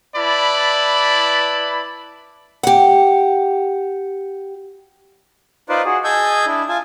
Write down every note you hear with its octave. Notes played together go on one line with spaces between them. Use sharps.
E4 B4 D5 A5 B5
G4 F#5
D#4 F4 B4 C5 D5
F#4 G#4
G#4 D#5 G#5 A5 E6 G6
D4 E4
F4 G#5 A5